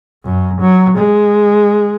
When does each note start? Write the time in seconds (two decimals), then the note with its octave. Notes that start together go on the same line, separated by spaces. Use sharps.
0.25 F#2
0.61 F#3
0.98 G#3